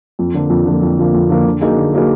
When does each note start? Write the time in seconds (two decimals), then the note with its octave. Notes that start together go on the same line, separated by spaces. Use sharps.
0.19 F2
0.34 D3 F3 A#3
0.50 F2
0.65 D3 F3 A#3
0.82 F2
0.97 D3 F3 A#3
1.14 F2
1.29 D3 F3 A#3
1.46 D3
1.61 F#3 A#3 D#4 G#4
1.76 D3
1.93 F#3 A#3 D#4 G#4